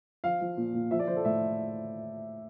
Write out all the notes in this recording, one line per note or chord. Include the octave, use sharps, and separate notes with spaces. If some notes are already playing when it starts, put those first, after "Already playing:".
F3 F5
F3
A#2
A#2
F3 E5
D5
F3 C5
A4
A2 E5